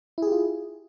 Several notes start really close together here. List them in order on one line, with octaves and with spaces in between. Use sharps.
E4 G#4 G4 F4